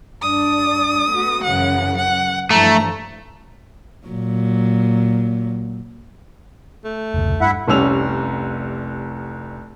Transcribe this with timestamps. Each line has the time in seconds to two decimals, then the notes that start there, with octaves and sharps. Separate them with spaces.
0.22 G2 D4 D5 D#6
1.11 A3 B3 F#4
1.43 F#2 C#3 E3 F#5
1.97 F#5
2.50 G2 E3 F3 A3 A#5
4.07 A#2 F#3
6.84 A3
7.14 F1 C#2
7.41 G2 E4 E5 F#5
7.68 F1 C2 G3 C#4 E6 F7